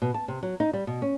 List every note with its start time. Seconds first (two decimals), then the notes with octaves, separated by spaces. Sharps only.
0.02 B2
0.14 A5
0.28 C3
0.43 F#3
0.60 D#4
0.73 G3
0.87 B2
1.02 C#4